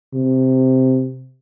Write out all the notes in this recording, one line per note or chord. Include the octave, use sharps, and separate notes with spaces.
C3